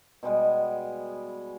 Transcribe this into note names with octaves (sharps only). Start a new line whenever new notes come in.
B2 G3 G#3 B3